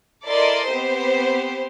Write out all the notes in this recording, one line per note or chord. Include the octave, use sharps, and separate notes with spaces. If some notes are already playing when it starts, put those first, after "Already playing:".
E4 A4 A#4 D5 D#5 C6
B3 C4 G4 C5